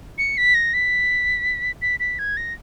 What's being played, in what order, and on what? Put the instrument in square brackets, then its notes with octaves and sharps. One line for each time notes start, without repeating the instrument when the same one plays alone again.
[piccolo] C#7
B6
A#6
B6
B6
B6
G#6
A#6